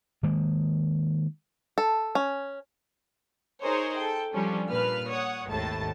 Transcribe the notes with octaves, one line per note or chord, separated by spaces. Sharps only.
D#3 G#3 A#3
A4
C#4
D#4 G#4 A#4 C5 C#5
A4 G5
F3 G3 C#4 D4
A#2 B4 F6
C#5 F#5 D#6
G#1 D#2 A2 A5 A6